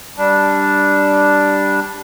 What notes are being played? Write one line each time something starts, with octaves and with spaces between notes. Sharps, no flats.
G3 D4